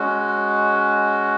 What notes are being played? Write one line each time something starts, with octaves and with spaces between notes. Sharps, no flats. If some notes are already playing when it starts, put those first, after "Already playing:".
Already playing: G#3 C#4 F#4